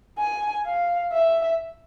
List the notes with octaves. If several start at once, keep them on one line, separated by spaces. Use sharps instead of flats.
G#5
F5
E5